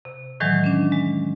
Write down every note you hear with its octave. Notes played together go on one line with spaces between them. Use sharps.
C3
A2 D#3 E3 F#3 G#3
C#4 D4
G#3